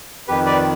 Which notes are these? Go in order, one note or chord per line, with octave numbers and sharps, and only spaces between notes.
F2 D#3 G4 B4
B4 D5